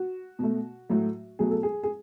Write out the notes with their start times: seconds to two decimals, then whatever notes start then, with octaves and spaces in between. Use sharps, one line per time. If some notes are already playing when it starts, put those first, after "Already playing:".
Already playing: F#4
0.39 B2 A3
0.89 A2 F#3 A3
1.39 B2 F#3 A3 G#4
1.51 A4
1.63 G#4
1.83 G#4